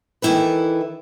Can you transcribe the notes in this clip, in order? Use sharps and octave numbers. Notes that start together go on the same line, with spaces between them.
D#3 E3 E4 A4 B4